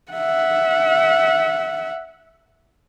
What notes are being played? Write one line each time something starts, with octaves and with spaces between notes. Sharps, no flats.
E5 F#5